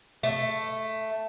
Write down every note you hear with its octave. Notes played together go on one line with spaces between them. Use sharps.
A3